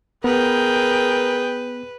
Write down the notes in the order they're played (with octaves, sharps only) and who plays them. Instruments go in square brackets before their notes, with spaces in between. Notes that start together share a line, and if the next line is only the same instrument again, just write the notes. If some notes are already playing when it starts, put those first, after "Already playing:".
[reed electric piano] B3 [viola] G#4 G5 [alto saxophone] A#4 [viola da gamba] B4